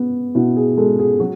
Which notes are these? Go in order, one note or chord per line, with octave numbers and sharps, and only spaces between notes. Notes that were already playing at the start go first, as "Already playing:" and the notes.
Already playing: B3
B2 E4
G#4
G#3 A4
G#4
F#3 F#4